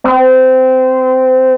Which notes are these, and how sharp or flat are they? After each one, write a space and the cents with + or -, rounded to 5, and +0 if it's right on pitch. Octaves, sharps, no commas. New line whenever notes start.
C4 -20